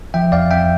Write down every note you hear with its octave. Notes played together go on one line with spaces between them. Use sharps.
F3 E5 G5
F2 D5 F5
F2 E5 G5